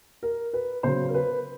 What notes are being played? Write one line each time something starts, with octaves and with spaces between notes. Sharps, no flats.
A#4
B4
C#3 F#3 B3 C5
A#4
B4